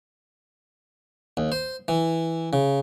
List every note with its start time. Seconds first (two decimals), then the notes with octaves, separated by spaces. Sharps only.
1.37 D#2
1.52 C5
1.88 E3
2.53 C#3